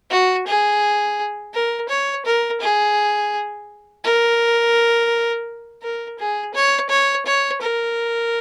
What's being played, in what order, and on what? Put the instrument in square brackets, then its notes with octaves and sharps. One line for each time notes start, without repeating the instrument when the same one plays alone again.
[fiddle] F#4
G#4
A#4
C#5
A#4
G#4
A#4
A#4
G#4
C#5
C#5
C#5
A#4